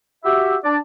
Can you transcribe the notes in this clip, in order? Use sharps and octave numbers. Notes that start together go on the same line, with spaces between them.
F#4 G4 E5
D4 D5